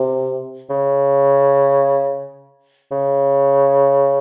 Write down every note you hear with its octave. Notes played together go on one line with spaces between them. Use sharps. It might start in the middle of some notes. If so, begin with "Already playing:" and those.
Already playing: C3
C#3
C#3